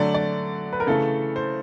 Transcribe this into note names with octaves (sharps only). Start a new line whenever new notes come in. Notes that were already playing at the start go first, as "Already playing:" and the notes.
Already playing: D3 F#3 A3 D5
D5
B4
A#4
C#3 E3 A3 A4
C5